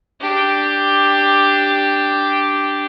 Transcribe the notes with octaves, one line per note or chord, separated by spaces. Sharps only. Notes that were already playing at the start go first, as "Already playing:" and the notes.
D4 G4